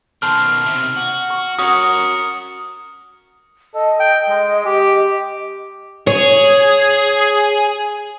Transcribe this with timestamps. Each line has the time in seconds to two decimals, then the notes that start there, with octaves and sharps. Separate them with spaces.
0.22 B2 D#3 C5 A5 C6 F6
0.66 D#2 C3
0.97 F#4
1.30 C#6
1.59 C#4 F#4 A#4 C#5 C#6 D#6 C#7
3.74 A4 D#5
4.00 G5
4.30 G#3
4.66 G4
6.07 G#4 C#5